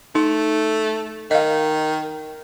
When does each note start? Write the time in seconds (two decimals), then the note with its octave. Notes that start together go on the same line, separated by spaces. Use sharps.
0.15 A3 D#4
1.31 D#3 D#5 F5